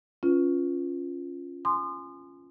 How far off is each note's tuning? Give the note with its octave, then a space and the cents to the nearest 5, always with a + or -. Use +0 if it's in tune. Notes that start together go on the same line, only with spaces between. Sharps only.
C#4 +0 F4 -5 B4 +0
G#5 +0 C6 -15 D#6 -40